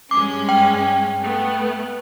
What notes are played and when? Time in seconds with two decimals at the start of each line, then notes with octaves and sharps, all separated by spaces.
0.11 G2 G#3 C#4 D6
0.49 G5
1.22 A3 B3